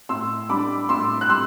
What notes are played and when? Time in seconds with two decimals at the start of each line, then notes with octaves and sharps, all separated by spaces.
0.09 A2 C6 E6
0.49 G3 D4 B5 D6
0.89 A2 C6 E6
1.21 F#6
1.29 G3 C6 E6